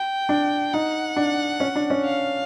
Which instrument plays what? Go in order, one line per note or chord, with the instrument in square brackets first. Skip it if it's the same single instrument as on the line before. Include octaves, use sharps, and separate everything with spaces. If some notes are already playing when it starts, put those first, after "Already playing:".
Already playing: [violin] G5
[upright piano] D4
[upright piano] D#4 [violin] F#5
[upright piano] D4
C#4
D4
C#4
[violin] F5